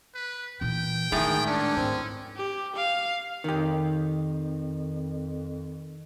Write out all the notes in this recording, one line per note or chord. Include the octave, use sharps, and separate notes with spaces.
B4
A#2 E3 G5
A2 D#3 G#3 G#4
C#4 D4
G#2 C4
G4
F5
F2 D#3 G4